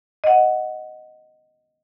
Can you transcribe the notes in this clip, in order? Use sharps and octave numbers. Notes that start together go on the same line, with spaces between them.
D#5 F#5